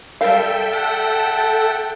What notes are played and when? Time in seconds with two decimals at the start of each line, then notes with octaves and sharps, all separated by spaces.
0.21 G3 A4 A#4 E5 F5 G5
0.73 F#5 A5